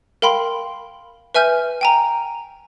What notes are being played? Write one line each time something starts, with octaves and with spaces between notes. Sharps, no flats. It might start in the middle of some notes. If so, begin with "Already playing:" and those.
A#4 F5 G5 B5 C6
B4 E5 G#5 F6 G6
G5 G#5 A#5